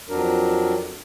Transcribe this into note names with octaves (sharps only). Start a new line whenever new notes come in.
F2 F#3 D4 A#4